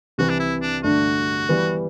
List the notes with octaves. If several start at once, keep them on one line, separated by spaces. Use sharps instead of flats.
C2 C3 E3 F#4
D4
E4
D4
G2 D3 A3 D4 F#4
E3 G3 B3